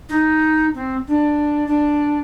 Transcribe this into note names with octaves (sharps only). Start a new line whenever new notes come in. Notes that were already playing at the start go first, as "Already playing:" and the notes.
D#4
C4
D4
D4